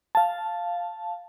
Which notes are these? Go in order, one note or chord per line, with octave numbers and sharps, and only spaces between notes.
F5 A5